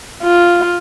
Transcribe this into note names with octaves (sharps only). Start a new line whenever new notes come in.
F4